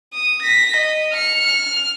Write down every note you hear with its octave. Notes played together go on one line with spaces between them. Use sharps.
D#6
A#6 B6
D#5
F6 C#7
F6